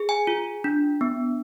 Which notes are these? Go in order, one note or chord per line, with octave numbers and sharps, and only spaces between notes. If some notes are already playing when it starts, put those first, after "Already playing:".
Already playing: G#4
G#5
F4
D4
B3